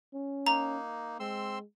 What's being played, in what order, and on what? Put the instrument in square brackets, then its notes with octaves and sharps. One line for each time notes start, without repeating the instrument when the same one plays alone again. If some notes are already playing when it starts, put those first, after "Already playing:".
[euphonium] C#4
[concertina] A#3 D#4 [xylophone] A#5
[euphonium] G#3 [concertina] C4 C6 E6